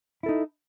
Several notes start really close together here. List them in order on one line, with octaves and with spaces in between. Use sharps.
E4 A4 D#4